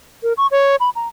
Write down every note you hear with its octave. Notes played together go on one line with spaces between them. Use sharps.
A#4
C#6
C#5
B5
A#5